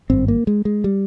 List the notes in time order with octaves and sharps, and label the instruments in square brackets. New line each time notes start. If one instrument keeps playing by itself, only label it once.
[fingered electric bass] G#1 G2 C4
A#3
G#3
G#3
G3